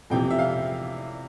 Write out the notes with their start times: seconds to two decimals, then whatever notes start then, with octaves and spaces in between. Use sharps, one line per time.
0.10 F2 C3 E3 G5
0.30 E5
0.39 F5